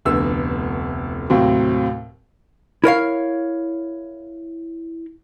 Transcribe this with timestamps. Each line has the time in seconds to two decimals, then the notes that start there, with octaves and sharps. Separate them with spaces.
0.05 F1 D2 B3 E6
1.30 D#2 A2 C3 F#3 C4
2.84 E4 A#4 C#5 F5